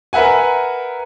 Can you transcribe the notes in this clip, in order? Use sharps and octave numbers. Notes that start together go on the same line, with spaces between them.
A#4 B4 E5 F#5 G#5